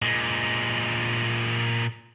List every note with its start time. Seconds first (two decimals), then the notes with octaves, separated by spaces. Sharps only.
0.02 A#2 G#3